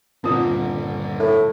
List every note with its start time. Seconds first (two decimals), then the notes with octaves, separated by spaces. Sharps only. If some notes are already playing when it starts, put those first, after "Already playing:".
0.24 D#1 G2 D3 C4 F4
1.19 A2